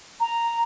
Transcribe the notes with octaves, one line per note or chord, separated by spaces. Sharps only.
A#5